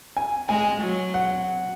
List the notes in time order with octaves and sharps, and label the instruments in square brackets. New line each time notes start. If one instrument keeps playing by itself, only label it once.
[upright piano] G#5
[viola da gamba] G#3 [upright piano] G#5
[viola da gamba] F#3
[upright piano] F#5